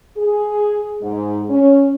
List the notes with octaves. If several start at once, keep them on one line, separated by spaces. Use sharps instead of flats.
G#4
G#2
C#4